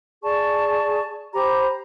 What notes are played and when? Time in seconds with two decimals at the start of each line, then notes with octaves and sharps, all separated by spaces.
0.23 G#4 D5 A5 C#6
1.34 G4 C5 A#5 B5